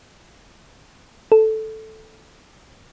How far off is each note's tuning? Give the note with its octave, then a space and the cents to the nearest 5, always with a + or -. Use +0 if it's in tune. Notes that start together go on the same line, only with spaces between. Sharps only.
A4 -5